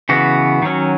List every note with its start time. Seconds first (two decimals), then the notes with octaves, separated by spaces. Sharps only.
0.09 C#3 E3 B3 F#4
0.62 D#3 F#3 C#4